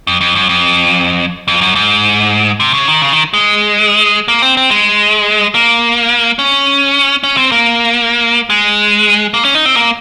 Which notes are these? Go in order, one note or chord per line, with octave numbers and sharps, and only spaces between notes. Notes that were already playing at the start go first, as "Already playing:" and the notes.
F2
F2
F#2
F2
F2
F#2
G#2
C3
C#3
D#3
C#3
D#3
G#3
A#3
C4
C4
G#3
A#3
C#4
C#4
C4
A#3
G#3
A#3
C#4
D#4
C4
A#3